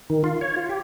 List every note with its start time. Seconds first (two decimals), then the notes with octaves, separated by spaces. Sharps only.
0.10 D#3
0.24 F4
0.41 C#5
0.56 F4
0.69 G4